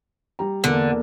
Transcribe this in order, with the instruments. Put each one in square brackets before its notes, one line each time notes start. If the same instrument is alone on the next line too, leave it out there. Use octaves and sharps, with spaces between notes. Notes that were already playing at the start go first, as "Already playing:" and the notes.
[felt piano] G3 A#5
[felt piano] E2 A#3 [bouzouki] D3